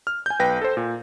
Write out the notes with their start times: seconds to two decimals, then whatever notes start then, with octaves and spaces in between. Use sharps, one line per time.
0.07 F6
0.26 G#5 G6
0.39 B1 B4 G5 A#6
0.61 A4 C5
0.77 A#2